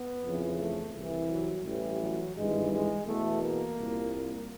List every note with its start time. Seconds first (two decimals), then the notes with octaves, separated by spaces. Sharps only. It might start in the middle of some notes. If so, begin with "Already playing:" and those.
Already playing: B3
0.24 F2 C#3 E3
0.59 A3
0.95 C2 C3 E3
1.30 F#3
1.64 A1 A2 E3 G3
2.00 F#3
2.35 G#1 G2 E3 G#3
2.71 G#3
3.06 E2 B2 A3
3.42 A#3
3.77 C2 A#2